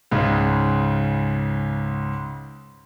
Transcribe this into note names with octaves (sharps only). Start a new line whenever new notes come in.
C#2 G#2 C#3